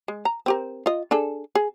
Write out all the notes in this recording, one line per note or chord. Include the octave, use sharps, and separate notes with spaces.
G#3
A#5
C4 G4 A#4
F4 D#5
D4 G#4 A4
G#4